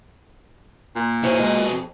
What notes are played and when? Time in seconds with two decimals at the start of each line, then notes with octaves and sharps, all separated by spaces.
0.96 A#2
1.23 B2 E4 G#4 C5 C#5
1.40 G#3 D#5
1.66 F2